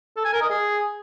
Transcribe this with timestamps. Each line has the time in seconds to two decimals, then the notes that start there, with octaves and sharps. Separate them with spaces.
0.16 A4
0.25 G#5
0.33 A#4
0.41 D#5
0.50 G#4